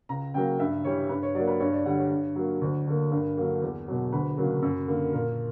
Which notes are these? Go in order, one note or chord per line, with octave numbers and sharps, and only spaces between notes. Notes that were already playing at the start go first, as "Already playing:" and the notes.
C#2 A#5
C#3 F#3 A#3 G5
G2 E5
E3 G3 C#5
G2 B4
C#5
F#3 A#3 D5
B4
G2 C#5
D5
D3 G3 F#5
C#5
G2
F#3 A#3
D2
D3 A#3
G2 A#4
D3 F#3 A#3
E2
B2 F#3
D2 B4
C#3 F#3 A#3
F#2
D3 A#3
A#2 A#4